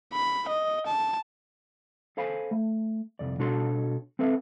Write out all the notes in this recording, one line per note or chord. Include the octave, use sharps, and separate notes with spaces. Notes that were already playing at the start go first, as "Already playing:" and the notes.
B5
D#5
A5
A4 C5 F5 G#5 B5
A3
C2 F2 D5
B2 D4 F#4 A4 C#5 C6
C4 A4 B4 E5 F5